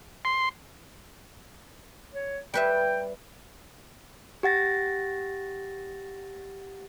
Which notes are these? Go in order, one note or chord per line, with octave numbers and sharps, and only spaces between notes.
C6
C#5
G3 B4 E5 G5
G4 F#5 A6 A#6